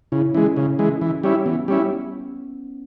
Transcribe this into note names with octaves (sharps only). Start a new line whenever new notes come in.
C#3 E4
E3 G#3 C#4
C#3
E3 G#3
E3
G3 C#4 E4
E3 B3
G3 C#4 E4